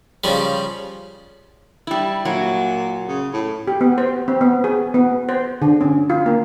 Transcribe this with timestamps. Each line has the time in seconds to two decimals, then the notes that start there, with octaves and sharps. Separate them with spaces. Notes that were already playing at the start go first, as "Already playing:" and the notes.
0.24 C#3 F3 G3
1.87 G3 E4
2.25 A#2 F#3
3.08 C#3
3.33 A2
3.68 G4
3.81 B3
3.98 C5
4.28 C4
4.41 B3
4.64 G#4
4.94 B3
5.29 C5
5.62 D3
5.81 C#4
6.10 F4
6.26 A#3